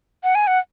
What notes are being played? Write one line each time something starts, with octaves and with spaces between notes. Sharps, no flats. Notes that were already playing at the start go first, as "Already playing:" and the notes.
F#5
G#5
F#5